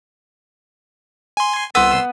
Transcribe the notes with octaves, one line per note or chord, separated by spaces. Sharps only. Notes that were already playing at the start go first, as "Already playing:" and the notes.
G#5 C6
C2 B3 C6 E6